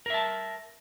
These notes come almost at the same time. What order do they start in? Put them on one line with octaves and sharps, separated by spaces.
A#4 E5 A5